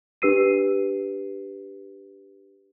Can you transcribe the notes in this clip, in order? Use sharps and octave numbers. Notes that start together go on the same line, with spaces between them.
D4 G4 B4 E6 C7 D#7